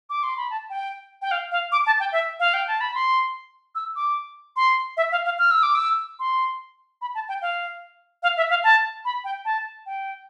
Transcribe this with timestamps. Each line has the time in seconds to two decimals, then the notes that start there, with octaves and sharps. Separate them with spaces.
0.10 D6
0.23 C6
0.37 B5
0.50 A5
0.70 G5
1.22 G5
1.31 F5
1.51 F5
1.72 D6
1.86 A5
2.00 G5
2.12 E5
2.40 F5
2.54 G5
2.67 A5
2.81 B5
2.94 C6
3.75 E6
3.96 D6
4.56 C6
4.97 E5
5.12 F5
5.25 F5
5.38 F6
5.51 E6
5.63 D6
5.75 E6
6.19 C6
7.01 B5
7.14 A5
7.28 G5
7.42 F5
8.23 F5
8.37 E5
8.50 F5
8.64 A5
9.05 B5
9.24 G5
9.45 A5
9.86 G5